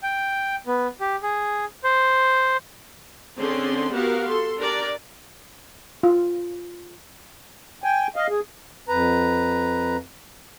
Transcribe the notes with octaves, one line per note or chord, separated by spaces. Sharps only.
G5
B3
G4
G#4
C5
D3 C4 C#4 G#4 D5 C6
B3 F#4 G4 A#4 F5 F#5
A4 C6
D4 G4 A#4 D5
F4
G5 G#5
D#5 F5
G#4
F2 B4 A#5